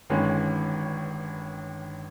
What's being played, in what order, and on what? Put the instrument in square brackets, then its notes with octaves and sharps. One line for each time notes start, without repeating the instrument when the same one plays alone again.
[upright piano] G1 G2 D#3 G#3 C#4